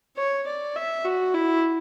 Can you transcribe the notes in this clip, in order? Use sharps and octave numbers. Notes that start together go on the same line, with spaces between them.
C#5
D5
E5
F#4
E4